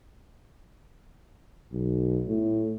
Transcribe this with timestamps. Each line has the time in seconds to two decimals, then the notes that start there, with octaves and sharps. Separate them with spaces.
1.72 B1
2.28 A2